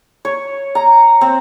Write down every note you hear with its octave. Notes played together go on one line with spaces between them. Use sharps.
C#5
A#5
C4